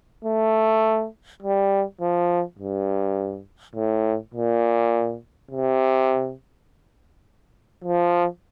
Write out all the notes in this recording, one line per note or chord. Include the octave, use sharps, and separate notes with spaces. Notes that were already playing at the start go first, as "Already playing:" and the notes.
A3
G3
F3
G2
A2
A#2
C3
F3